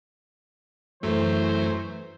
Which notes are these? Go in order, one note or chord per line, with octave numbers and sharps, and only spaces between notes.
F#2 E3 F#3 A3 C5